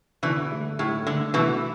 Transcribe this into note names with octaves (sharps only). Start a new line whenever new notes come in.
B2 D3 E3
A3
A2 A3
D3 A3
B2 E3 A3